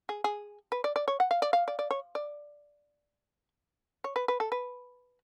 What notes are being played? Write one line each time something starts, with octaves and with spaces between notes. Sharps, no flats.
G#4
G#4
B4
D5
D5
C#5
F#5
F5
D5
F5
D5
D5
C#5
D5
C#5
B4
B4
A4
B4